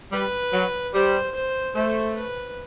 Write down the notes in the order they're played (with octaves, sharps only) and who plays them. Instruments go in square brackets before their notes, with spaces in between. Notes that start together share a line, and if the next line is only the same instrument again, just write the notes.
[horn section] G3 [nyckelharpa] B4
[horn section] F#3
[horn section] G3 [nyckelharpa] C5
[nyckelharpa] C5
[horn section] A3 [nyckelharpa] C5
[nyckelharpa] B4